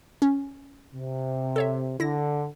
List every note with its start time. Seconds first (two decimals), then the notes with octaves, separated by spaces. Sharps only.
0.22 C#4
0.95 C3
1.56 A4 C#5 E5
2.00 D3 E4 A#6